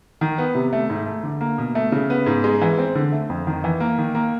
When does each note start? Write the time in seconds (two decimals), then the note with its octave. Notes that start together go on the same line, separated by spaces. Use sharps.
0.21 D#3
0.38 B3
0.55 C3
0.73 A3
0.90 G#2
1.06 A3
1.23 D3
1.41 A#3
1.58 B2
1.75 A3
1.92 C#3
2.10 B3
2.26 G#2
2.44 G#3
2.62 E3
2.78 C4
2.95 D3
3.12 A3
3.30 F2
3.47 D#3
3.64 E3
3.80 A#3
3.98 D#3
4.15 A#3